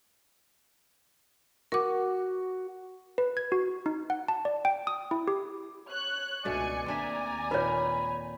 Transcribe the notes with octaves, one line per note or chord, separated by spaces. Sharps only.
F#4 A#4 D6
B4
G#6
F#4
D#4
F#5
A5
D5
G5
D#6
E4
G4
C#5 F#6
C#2 B2 A3 D4 D5 G#5 C#7
D#2 C4 D4 E5 G#5 A#5
A#2 D#3 B4 C#5 B5